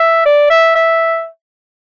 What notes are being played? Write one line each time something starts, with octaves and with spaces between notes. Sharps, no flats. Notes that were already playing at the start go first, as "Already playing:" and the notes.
Already playing: E5
D5
E5
E5